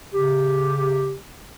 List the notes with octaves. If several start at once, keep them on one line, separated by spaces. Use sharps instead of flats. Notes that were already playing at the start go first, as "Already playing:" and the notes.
C#3 G4